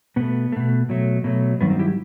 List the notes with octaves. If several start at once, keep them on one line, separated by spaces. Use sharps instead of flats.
B2 A3 B3
B2 A3
B2 F#3 A3
B2 F#3 A3
G2 D#3 F#3 B3
C4
E4 G4